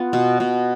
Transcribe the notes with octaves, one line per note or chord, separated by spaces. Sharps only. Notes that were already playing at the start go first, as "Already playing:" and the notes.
Already playing: B3 F4
B2
B2